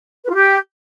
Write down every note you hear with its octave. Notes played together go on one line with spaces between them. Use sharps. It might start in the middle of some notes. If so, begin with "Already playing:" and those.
B4
F4
G4